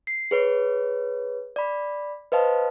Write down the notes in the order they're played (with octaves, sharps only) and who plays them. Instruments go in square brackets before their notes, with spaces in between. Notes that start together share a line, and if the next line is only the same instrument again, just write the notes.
[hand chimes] C7
G#4 B4 C#5
D5 B5
B4 C5 D#5 F5 A5